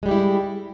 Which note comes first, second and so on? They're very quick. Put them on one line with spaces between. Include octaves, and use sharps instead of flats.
G#3 G3 G4 E4